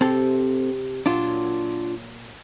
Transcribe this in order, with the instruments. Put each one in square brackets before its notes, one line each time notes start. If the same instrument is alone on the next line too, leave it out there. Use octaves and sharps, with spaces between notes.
[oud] C3 G4 [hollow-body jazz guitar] C4 A4
[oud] A#2 F#3 [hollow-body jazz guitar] D4 F4